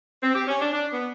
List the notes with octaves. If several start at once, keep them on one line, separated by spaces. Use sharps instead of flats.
C4
G4
C#4
D4
D4
B3